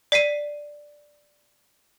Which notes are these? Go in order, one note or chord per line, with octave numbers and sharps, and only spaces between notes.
D5 B6 C7 D#7